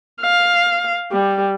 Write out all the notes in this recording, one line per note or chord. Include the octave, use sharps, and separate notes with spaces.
F5
G3